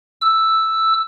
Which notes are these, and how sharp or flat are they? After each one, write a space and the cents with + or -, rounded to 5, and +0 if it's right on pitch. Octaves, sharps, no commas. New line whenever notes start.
E6 +0